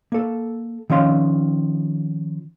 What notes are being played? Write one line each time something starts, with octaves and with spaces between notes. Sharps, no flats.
A#3 A4
D#3 F3 C#4 F5 C6